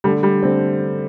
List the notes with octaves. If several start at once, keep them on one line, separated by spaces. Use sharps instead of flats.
D3 G3 A3 D4
G3
D3 A3 C4 D4